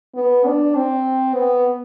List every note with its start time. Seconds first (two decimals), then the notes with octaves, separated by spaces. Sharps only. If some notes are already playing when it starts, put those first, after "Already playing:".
0.15 B3
0.46 D4
0.75 C4
1.35 B3